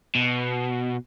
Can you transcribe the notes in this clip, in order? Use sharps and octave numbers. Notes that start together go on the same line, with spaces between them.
B2